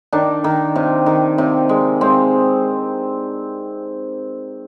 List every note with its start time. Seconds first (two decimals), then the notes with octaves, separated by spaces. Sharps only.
0.13 D#3 D4
0.44 D#3
0.76 C3
1.06 D#3
1.38 C3
1.69 G#3
2.01 G#3 C4